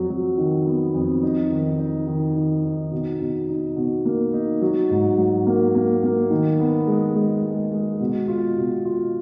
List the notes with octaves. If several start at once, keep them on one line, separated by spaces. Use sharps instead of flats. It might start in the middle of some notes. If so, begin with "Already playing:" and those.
Already playing: F2 F#3
F#3
D#3
B3
F2
D#4
D#3
D#4
D#3
D#3
D#4
B2
B2
D#4
B2
A#3
D#4
F#3
G#2
F#3
A#3
A#3
A#3
D#3
B3
G#3
G#3
G#3
G#3
B2
F4
B2
F4